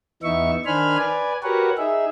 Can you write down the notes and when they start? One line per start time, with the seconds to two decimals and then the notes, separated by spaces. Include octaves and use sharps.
0.23 E2 E3 B3 D#4 E5 C#6
0.65 D#3 D4 C5 G#5 B5 F6
0.97 B4 D5 G#5
1.43 F#4 G4 A#4 B4 C#5 F#5
1.78 D#4 G#4 E5